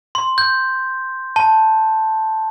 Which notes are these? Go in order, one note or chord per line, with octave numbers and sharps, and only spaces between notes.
C6
G6
A5